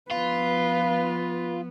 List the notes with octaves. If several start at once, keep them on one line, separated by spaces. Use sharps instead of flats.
F3 B3 F4 B4